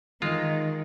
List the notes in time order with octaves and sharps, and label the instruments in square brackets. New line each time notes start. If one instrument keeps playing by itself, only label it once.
[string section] D#3 [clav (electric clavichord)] G#3 F4